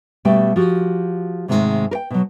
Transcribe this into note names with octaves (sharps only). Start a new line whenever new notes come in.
B2 G3 A3 G5
F3 F#4 G4
G#2 C3 D#3 F3 G#3 A3
A#4 G5
B2 F#3